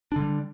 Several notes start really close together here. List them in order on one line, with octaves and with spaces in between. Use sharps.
D4 D3 G3